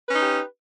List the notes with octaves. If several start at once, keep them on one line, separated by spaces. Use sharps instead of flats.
C#4 D#4 G4 B4